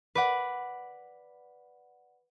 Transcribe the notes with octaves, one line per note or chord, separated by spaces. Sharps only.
B4 D5 F#5